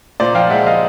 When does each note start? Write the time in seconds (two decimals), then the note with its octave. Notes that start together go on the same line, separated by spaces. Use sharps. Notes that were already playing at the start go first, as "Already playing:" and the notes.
0.20 A#2 C5 D5
0.35 F3 F5 G5
0.50 G#3 E5 F#5
0.66 D#5 F5